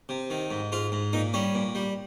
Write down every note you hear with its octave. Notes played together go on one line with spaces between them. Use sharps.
C3
D#3
G#2
G#2 F4
G#2
A#2 D#4
G3 C#4
A#2
G3